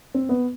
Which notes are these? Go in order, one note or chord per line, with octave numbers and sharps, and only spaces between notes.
C4
B3